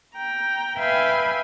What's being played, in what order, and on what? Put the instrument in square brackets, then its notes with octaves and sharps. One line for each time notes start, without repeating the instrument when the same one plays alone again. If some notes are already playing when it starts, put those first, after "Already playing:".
[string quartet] G5 A#5
B4 E5 F5 G5 G#5 B5